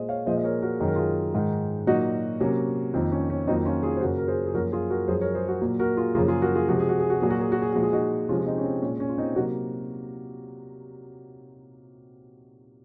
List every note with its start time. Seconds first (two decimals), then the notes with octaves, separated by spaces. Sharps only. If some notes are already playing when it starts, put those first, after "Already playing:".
Already playing: A#2 G#3 C5 D#5
0.09 C#5 F5
0.26 A#2 F3 G#3 C5 D#5
0.38 D#5
0.44 A#4 C#5
0.62 F#4 A#4
0.80 F#2 D#3 G#3 G#4
0.88 A#4
0.96 F4 G#4
1.34 G#2 D#3 G#3
1.87 A#2 F#3 A#3 D#4 F#4
2.40 C3 F#3 A#3 C#4
2.94 F2 D#3 A#3 C4
3.12 C#4
3.30 C#4
3.47 F2 D#3 F#3 A#3 C4 D#4
3.65 C#4 F4
3.83 F4 G#4
3.97 C5
4.01 F#2 C#3 F#3 A#3 F#4 A#4
4.18 A#4
4.28 G#4 C5
4.46 G#4
4.54 F#2 F3 A#3 F#4 A#4
4.72 F4 G#4
4.90 F#4 A#4
5.08 F#2 F3 G#3 G#4 C5
5.21 A#4 C#5
5.34 G#4 C5
5.48 F#4 A#4
5.61 A#2 F#3 A#3
5.79 F#4 A#4
5.97 F4 G#4
6.15 F#2 C#3 F3 A#3 F4 G#4
6.28 F4 G#4
6.42 F#4 A#4
6.55 F4 G#4
6.69 C3 F3 G#3 F#4
6.79 G#4
6.89 F#4
7.00 G#4
7.10 F#4
7.20 A#2 F#3 A#3 G#4
7.30 F#4
7.41 G#4
7.52 F#4
7.62 G#4
7.73 A#2 F3 G#3 F#4
7.83 G#4
7.93 D#4 F#4
8.29 C3 F3 G#3 C#4 F4
8.40 F4
8.47 C4 D#4
8.58 C#4
8.65 C4
8.82 A#2 G#3 C#4
9.00 C#4
9.09 F4
9.18 C4 D#4
9.36 C3 F#3 A#3 D#4 F#4